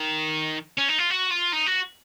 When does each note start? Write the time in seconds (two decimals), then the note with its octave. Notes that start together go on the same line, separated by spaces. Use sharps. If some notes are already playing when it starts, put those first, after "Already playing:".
Already playing: D#3
0.78 C#4
0.88 D#4
0.98 F4
1.10 F#4
1.30 F4
1.52 D#4
1.66 F#4